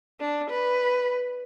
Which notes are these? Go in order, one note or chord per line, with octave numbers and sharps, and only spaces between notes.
D4
B4